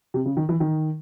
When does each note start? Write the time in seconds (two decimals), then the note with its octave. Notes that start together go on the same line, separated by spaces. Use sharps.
0.14 C3
0.25 C#3
0.37 D#3
0.49 E3
0.60 D#3